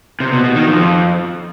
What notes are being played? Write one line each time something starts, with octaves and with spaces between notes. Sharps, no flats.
C3
B2
B2
D#3
F2